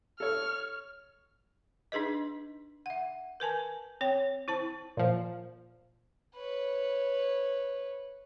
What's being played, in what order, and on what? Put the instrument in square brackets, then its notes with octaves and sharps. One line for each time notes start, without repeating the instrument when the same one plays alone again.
[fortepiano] A4 C#5 [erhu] F6
[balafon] D4 D#4 G#4 B4 D#5
E5 F#5
A#4 B4 G#5 A5
C4 C#5 G5
E4 C5 A5
[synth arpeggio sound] A#2 F3
[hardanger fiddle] B4 C#5